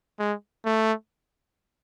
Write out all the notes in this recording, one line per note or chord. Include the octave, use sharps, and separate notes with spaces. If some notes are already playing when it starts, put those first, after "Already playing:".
G#3
A3